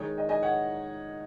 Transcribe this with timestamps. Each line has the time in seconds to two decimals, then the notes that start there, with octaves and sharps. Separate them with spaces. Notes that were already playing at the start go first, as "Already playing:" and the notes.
Already playing: D#3 G#3 D#4 C#5
0.18 D#5
0.29 D#5 G#5
0.43 C#5 F#5